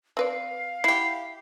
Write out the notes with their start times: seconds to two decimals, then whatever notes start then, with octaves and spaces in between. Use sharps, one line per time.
0.17 C4 B4 D5 F5
0.84 E4 G4 F#5 C7